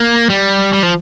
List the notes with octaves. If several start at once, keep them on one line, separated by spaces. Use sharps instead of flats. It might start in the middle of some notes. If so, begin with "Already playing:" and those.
Already playing: A#3
G3
G3
F3